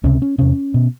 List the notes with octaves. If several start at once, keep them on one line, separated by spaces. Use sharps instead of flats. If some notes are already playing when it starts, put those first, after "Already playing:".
C#2 C3 C#4
C#4
E2 C3 C#4
B2